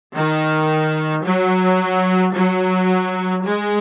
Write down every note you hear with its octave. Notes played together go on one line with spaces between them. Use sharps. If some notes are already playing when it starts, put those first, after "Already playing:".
D#3
F#3
F#3
G#3